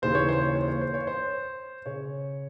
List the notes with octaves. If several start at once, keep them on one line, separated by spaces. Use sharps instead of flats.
D#2 C#3 E3 C5
C#5
C5
C#5
C5
C#5
C5
C#5
C5
C#3 C#5